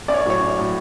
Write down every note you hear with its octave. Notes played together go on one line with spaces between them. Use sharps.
A#1 D5
C#5
D5
A2 F#3 C#5
A#1
A2 F#3